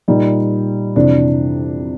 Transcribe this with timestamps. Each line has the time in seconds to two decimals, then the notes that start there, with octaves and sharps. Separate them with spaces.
0.08 A#2 G3 D#4
0.96 F2 C3 E3 D4